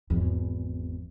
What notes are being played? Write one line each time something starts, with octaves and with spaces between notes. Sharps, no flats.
G#1 E2